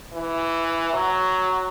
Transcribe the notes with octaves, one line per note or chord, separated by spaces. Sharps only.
E3
F#3